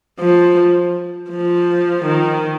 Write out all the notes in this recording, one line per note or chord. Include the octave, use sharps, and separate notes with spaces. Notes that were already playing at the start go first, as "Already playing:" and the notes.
F3
F3
D#3